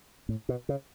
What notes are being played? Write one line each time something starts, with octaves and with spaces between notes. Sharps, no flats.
A2
B2
C#3